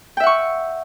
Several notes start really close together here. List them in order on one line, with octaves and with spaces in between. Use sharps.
G5 E5 F#5 C#6